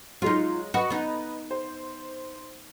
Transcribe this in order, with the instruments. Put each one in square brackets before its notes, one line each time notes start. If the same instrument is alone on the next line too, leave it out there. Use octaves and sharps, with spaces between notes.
[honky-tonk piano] F#3 G#3 [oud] D#4 F4
[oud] F#4 [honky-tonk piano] B4 D#5
[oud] B3 D#4
[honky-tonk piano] C5